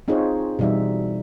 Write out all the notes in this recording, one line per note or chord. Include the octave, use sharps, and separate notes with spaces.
C4 D#4 F4 G#4 C5 C#5
B2 E3 G3 D#4 E5